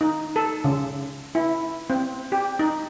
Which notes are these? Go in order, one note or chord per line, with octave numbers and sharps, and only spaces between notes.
D#4
A4
C#3
E4
C4
G4
D#4